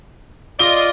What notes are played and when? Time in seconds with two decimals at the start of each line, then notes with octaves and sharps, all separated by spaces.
0.59 F4 D5 D#5 G7